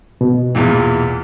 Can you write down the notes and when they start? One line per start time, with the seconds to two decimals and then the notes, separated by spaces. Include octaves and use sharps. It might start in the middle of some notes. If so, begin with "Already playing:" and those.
0.21 B2
0.55 E2 A#2 E3